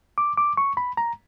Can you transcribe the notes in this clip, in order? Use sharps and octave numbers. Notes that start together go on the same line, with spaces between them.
D6
D6
C#6
B5
A#5